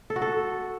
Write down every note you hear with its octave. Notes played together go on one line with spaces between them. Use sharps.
A4
F#4
A4